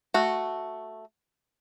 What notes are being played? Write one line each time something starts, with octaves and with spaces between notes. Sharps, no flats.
A3 F#4